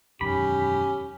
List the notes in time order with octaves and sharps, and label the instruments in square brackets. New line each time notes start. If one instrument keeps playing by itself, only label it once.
[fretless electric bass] E1 F#2 D#3 [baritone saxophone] C#4 [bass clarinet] G4 [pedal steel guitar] B5